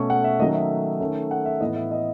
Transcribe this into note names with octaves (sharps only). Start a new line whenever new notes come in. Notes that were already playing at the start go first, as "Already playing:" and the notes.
Already playing: B2 A3 C#4 C#6
F#5
E5
D#3 F#3 A3 C#4 D#5
E5
D#3 A3 C#4
F#5
E5
A2 E3 B3 D#5
E5
D#5